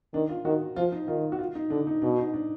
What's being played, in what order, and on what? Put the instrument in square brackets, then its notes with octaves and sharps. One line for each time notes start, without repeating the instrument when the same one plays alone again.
[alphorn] D#3 [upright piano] D4
[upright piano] F4
[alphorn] D#3 [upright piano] F#4
[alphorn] F3 [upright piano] F4
[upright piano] D#4
[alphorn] D#3 [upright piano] F4
[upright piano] F#4
F4
D#4
[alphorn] D3 [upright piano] D4
[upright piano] D#4
[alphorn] B2 [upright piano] D4
[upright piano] D#4
D4